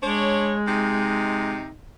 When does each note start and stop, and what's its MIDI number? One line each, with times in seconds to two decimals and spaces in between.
0.02 1.58 56
0.02 0.55 62
0.02 0.55 73
0.67 1.70 48
0.67 1.70 63